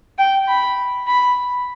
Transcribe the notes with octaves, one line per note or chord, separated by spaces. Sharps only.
G5
B5
B5